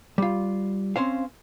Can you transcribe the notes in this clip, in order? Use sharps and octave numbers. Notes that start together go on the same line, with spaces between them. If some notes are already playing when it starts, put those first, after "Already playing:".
G3 F4
C4 C#4 C5 F5